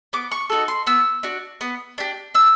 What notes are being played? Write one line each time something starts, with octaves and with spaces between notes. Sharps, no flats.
B3 D6
C#6
D#4 F#4 A4
C6
B3 E6
D4 F#4
B3
D4 G4
D4 E6